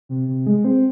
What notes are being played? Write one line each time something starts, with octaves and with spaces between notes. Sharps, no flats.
C3
C3
G#3
C4